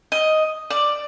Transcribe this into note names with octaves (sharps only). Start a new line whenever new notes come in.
D#5
D5